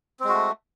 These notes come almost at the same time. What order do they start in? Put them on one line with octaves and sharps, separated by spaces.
C4 G#3 F#4 A3